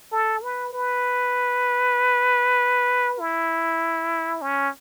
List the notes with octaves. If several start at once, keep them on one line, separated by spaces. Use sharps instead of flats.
A4
B4
B4
E4
C#4